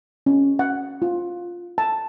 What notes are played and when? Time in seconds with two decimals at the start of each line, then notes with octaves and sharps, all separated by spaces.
0.26 C#4
0.59 F#5
1.02 F4
1.78 A5